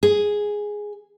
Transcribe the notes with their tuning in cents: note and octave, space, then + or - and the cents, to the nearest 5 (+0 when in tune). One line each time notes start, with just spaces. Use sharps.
G#4 +0